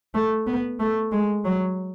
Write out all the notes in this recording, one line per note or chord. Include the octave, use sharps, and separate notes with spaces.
A3
B3
A3
G#3
F#3